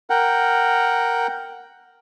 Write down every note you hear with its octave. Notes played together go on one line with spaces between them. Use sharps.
A#4 F#5 G5